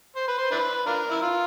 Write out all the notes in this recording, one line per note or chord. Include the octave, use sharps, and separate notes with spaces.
C5
B4
C5
D4 E4 B4
D4 F4 A#4
E4
F4